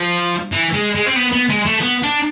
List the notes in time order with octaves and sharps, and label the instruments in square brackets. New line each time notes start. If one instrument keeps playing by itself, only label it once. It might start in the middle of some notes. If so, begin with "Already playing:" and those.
Already playing: [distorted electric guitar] F3
E3
G#3
G#3
C4
B3
B3
G#3
A3
B3
D4